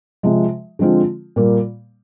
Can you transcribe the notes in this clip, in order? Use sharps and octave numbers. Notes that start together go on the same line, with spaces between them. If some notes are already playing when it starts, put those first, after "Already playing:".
C3 F3 G#3
D3 F3 G#3 C4 F4
A#2 G3 A#3